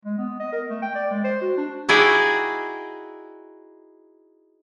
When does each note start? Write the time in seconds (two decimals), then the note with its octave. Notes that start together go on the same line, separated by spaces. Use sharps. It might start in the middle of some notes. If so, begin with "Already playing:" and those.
0.05 G#3
0.18 B3
0.40 D#5
0.52 A#4
0.70 A3
0.82 G5
0.95 D5
1.11 G#3
1.24 C5
1.42 F#4
1.58 D4
1.89 D#4 E4 F#4 G#4 D5 G5